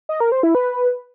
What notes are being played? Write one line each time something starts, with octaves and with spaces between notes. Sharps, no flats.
D#5
A#4
C5
E4
B4